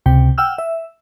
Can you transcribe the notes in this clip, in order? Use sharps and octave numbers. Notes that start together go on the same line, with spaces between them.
C#2 C3 G5
F#5 G5 E6 F6
E5